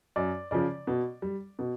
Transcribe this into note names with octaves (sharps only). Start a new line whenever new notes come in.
F#2 D5
C#3 F3 D5
B2
G3
B2